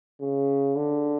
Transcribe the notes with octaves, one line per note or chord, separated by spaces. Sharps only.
C#3
D3